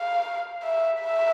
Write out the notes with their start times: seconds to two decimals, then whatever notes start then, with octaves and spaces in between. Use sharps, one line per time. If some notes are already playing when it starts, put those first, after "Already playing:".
Already playing: F5
0.63 E5
1.02 E5